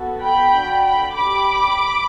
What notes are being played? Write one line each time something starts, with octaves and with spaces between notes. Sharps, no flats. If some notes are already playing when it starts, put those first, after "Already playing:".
Already playing: B3 F#4 A4
G5 B5
D4 F#4 A4
G5 B5
D4 G4 B5 D6